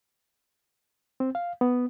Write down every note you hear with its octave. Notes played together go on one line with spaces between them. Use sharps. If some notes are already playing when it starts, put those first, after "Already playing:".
C4
F5
B3